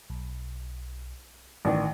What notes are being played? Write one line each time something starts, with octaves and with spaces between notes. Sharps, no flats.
B1
A1 D#3 D5